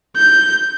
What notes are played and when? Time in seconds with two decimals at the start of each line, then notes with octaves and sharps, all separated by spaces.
0.17 G6